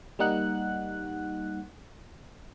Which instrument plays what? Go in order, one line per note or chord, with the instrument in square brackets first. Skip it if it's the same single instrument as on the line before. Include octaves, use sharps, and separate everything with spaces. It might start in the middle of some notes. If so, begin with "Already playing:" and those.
[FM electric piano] G3 A#3 D#4 F#5 F#6